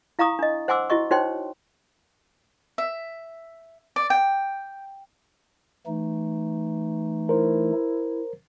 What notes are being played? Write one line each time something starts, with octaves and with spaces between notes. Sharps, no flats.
E4 F5 A#5 C#6 D#6
D4 D#5
C5 F#5 G#5 C6 D6 E6
E4 F#4 D#5 C#6
D#4 F#4 C5 C#5 G5 C6
E5
D5
G5
E3 A3 D#4
E4 A#4 C5